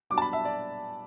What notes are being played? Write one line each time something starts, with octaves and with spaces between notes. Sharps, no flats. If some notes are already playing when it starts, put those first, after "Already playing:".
G2 F#3 B3 D4 D6
A5
B5
E5
D5